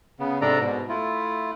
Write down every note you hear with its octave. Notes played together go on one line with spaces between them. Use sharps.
C#3 B3
G#2 C3 D4 A4 D5 A#5
G#2 B2
A3 E4 F4